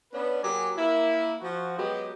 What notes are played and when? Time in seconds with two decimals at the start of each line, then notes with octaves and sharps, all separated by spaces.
0.13 B3 C#4 D4 B4
0.42 F#3 A#3 G4 G#4 G#5
0.77 A#3 E4
1.41 F3 F#4
1.77 F#3 G#3 B3 G4